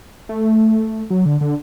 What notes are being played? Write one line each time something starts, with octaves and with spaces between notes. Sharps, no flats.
A3
F#3
D3
D3